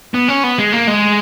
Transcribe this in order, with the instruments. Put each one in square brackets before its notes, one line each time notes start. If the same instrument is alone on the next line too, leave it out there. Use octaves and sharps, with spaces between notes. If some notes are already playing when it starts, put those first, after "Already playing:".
[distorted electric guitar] B3
C#4
B3
G#3
A#3
G#3